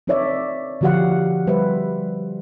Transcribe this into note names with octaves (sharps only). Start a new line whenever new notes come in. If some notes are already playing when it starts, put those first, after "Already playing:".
C4 D#4 A4 C#5 D5 E5
D3 F3 F#4 G4 F5 F#5
G3 B4 C5 E5